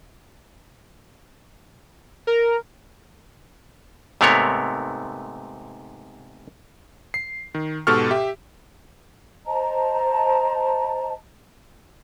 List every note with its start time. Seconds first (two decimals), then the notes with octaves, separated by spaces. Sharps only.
2.27 A#4
4.21 G#2 C3 A3 B3 A#4 C#5
7.14 C7
7.55 D#3
7.87 G#2 B2 G4 A4 C#6 F6
8.11 G4 E5
9.46 C5 D#5 A5 A#5